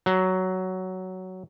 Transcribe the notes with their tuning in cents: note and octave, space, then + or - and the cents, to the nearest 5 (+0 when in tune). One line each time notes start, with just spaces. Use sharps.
F#3 +10